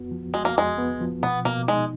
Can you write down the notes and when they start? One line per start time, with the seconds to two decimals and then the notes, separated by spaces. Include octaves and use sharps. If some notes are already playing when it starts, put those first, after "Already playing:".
Already playing: F2 B3 F#4
0.11 F3
0.34 G#3 F#4
0.45 A#3
0.56 F2 G#3
0.78 B3
1.01 F3
1.23 B2 B3
1.45 B2 A#3
1.68 G#3 D#4